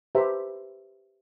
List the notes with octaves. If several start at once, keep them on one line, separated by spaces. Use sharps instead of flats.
G4 B4 C5 E5 A#5